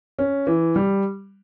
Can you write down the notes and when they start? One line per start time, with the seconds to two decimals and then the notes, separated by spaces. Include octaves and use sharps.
0.19 C#4
0.47 E3
0.76 G3